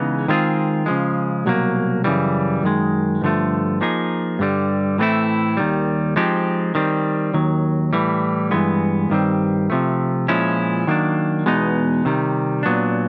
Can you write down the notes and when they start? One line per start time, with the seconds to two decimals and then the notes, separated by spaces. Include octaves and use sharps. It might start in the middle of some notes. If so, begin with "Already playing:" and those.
Already playing: C#3 E3 G#3 B3 D#4
0.28 D#3 G#3 C4 F4 G#4
0.86 C#3 F3 G#3
1.46 C2 B2 F#3 A#3
2.04 F#2 C#3 E3 G3
2.63 F#2 D#3 G#3
3.22 G2 D3 F3 A3
3.81 F3 A#3 D#4 G#4
4.39 G2 D3 G3
4.98 A2 E3 A3 C4 E4
5.57 D#2 D#3 G3
6.16 F3 G#3 C4 D#4 G4
6.75 D#3 G3 C4
7.34 D#2 D#3 F#3
7.93 A2 E3 G3
8.51 G2 E3 G#3 B3
9.10 G2 D#3 G3 C4
9.70 C3 F3 A3
10.28 A#2 F3 G#3 C#4 E4
10.87 D#3 F#3 A#3 D4
11.46 E2 B2 G#3 B3 D#4
12.05 C3 D#3 G3
12.63 A#2 F#3 B3 D4